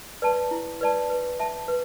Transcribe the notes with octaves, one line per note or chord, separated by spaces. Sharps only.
B4 D5 A5
E4
B4 D5 A5
B4
E5 A5
B4